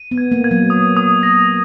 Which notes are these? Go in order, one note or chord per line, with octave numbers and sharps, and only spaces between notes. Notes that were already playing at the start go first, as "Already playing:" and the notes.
Already playing: D#7
B3
G#6
A#3
G#6
F#3
D#6
D#6
A#6